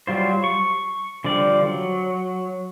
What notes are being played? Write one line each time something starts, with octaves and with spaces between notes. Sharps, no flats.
F#3 G3 F4 C5
C#6
D3 F3 G3 D5
F#3